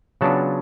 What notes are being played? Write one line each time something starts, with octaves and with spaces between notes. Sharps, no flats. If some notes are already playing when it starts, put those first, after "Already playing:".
C#3 F#3 B3 D4 F4 F#5 A5